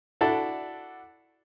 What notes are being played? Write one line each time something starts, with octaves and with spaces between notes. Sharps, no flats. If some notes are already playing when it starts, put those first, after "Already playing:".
D4 E4 F#4 A4 D5